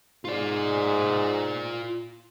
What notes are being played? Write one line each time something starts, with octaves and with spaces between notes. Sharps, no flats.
G#2 F4 D5